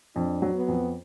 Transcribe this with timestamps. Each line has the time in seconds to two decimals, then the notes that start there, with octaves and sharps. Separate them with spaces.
0.16 F2 D4
0.42 F#3
0.54 B3
0.68 F2